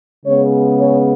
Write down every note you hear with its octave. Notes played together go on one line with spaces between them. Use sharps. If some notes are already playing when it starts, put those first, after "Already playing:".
C#3 G#3 B3 C#5
C#5